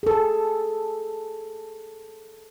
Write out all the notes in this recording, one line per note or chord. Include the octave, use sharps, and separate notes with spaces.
G#4 A4